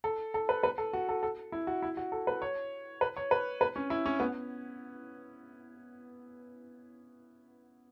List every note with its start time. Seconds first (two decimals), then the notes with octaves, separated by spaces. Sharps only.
0.04 A4
0.34 A4
0.49 B4
0.63 B4
0.78 A4
0.93 F#4
1.09 A4
1.23 A4
1.52 E4
1.67 F#4
1.82 E4
1.97 F#4
2.12 A4
2.27 B4
2.42 C#5
3.01 B4
3.16 C#5
3.31 B4
3.61 B4
3.76 C#4
3.90 E4
4.06 C#4
4.20 B3